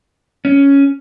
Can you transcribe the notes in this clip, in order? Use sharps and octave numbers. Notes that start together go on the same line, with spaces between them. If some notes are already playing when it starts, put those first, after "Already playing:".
C#4